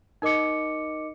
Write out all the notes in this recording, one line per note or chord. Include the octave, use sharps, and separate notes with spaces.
D#4 A#4 D#5 D6 C#7